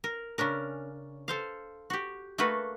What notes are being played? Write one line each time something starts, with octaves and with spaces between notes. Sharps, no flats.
A#4
C#3 C#4 D4 A#4
A4 C5 F5
F#4 G4
A3 A#3 F#4 A4 B4